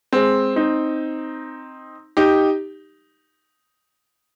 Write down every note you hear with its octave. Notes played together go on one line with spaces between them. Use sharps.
G#3 C4
C4 D#4
D#4 G4